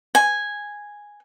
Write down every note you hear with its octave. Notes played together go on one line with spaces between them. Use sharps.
G#5